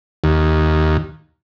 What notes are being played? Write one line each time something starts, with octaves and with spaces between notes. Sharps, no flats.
D#2